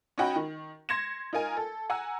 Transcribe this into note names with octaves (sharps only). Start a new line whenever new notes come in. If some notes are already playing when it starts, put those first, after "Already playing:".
C#4 D#4 F#4 G5 B5
D#3
C6 G#6 A#6 C#7 E7
D#4 F4 A#4 G#5
A4
F#5 G#5 A#5 E6